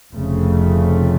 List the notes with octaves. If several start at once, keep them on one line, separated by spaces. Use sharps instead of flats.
F1 F2 C#3 A3